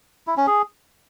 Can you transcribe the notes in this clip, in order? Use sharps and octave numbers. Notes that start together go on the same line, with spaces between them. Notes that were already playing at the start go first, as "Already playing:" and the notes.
E4
C#4
G#4